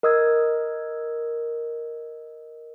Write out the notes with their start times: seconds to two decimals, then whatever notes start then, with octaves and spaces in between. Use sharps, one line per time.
0.03 A#4 D#5 D#6 E6 G#6